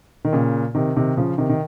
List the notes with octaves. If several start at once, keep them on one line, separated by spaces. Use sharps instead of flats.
D#3
A#2 C#3
C3 D#3
C3 D#3
C#3 F3
C3 D#3
D#3